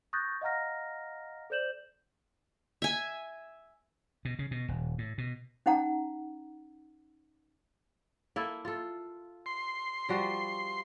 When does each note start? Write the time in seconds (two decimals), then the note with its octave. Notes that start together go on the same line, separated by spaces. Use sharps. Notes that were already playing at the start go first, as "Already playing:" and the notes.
0.13 C#6 D#6 F#6 G6 A6 A#6
0.41 D#5 F5 F#5 A#5 F6 A#6
1.50 A4 C5 D5 G6 E7 F#7
2.82 E5 G#5
4.25 B2
4.39 C#3
4.51 B2
4.68 D#1
4.98 A2
5.18 B2
5.66 C#4 D#4 F#5 A#5
8.36 A#3 E4 A4
8.65 F4 A4
9.46 C6
10.09 F3 G3 F#4